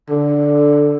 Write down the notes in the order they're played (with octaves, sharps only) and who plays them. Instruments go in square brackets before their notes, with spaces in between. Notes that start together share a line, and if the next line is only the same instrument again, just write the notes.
[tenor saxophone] D3